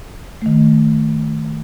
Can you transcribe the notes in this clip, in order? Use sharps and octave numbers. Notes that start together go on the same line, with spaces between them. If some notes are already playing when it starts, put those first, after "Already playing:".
D#3 A3